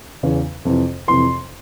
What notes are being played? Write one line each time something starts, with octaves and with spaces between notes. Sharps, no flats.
E2 C#3 E3
F2 C3 E3
F2 C3 E3 C6